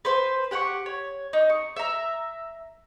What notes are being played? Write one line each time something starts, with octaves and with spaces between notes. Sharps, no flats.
B4 C5 C6
G4 F#5 G5 C#6
C#5
D#4
C#6
E5 A#5